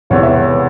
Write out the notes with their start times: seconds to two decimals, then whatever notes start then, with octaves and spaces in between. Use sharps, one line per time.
0.10 E1 E2 C3 E3 C#5
0.23 E5
0.34 C#5